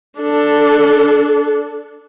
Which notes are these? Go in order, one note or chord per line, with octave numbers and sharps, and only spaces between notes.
D4 A4